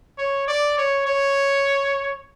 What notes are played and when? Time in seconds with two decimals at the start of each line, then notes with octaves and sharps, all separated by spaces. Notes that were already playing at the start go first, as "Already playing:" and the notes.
0.18 C#5
0.48 D5
0.78 C#5
1.07 C#5